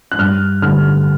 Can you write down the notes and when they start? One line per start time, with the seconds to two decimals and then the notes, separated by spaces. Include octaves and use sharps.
0.12 F#6
0.18 G2 F6
0.62 D3 G3 F6